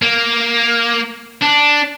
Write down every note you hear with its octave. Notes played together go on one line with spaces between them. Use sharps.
A#3
D4